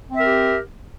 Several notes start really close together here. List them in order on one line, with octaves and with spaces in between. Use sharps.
C4 E5 A#4 G4